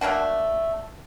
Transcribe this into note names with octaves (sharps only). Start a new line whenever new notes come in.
A3 A#3 D4 F#4